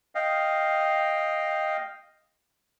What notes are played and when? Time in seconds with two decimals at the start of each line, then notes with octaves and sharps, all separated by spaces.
0.15 D#5 F5 G5